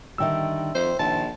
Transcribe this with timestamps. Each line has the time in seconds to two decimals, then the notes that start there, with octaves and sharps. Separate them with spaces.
0.18 D3 D#3 G3 E5 G5 E6
0.75 F2 C5
0.99 A#1 D#3 A5